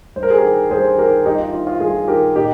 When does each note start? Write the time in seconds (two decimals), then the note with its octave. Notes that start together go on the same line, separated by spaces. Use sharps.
0.16 G2 C5
0.23 A#4
0.30 G#4
0.38 G4 A#4
0.43 D#3
0.71 G2 G#4 C5
0.98 D#3 G4 A#4
1.26 G2 D#4 G4
1.39 F4
1.53 D#3 F4
1.67 F4
1.80 G2 F4 G#4
2.08 D#3 G4 A#4
2.35 A#2 D#4 G4